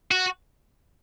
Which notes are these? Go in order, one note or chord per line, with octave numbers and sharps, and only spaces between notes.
F#4